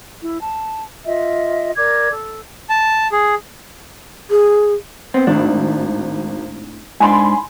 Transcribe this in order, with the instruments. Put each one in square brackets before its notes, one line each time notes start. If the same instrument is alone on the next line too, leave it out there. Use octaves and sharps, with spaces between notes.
[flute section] E4
A5
F4 D#5 E5
A#4 D5 D6 G#6
A4
[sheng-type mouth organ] A5
G#4
[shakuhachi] G#4
[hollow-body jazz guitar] B3 C4
[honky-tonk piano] G#1 [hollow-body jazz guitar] A2 D4
[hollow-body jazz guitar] G#2 D4 [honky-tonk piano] G#5 B5 C6